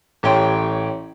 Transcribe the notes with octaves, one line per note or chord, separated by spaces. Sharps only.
A1 G4 C#5 G5 C6